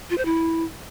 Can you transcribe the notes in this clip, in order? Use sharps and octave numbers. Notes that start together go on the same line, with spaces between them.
F4
C5
E4